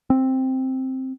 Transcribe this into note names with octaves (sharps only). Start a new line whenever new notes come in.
C4